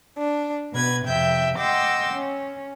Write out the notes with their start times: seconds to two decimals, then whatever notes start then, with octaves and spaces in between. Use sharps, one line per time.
0.18 D4
0.73 B2 B4 G#6
1.05 F2 C3 F3 E5 G5 G6
1.57 D#5 F#5 G5 C6 D6 E6
2.13 C#4